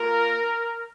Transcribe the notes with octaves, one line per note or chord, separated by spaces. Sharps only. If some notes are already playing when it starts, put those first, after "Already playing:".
Already playing: A#3 F4 A#4